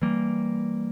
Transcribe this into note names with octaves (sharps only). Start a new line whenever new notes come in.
E3 G3 A#3